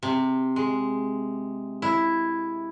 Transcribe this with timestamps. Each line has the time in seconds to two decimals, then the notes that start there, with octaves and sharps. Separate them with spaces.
0.03 C3
0.56 G#3
1.82 E4